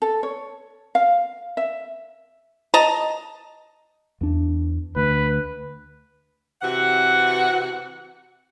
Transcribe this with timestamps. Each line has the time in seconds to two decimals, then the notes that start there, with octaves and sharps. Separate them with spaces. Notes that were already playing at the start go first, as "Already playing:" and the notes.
0.02 A4
0.23 C#5
0.95 F5
1.57 E5
2.74 D#5 A5 A#5
4.21 E2 D4
4.96 D2 B4
6.62 C3 E3 F#4 F#5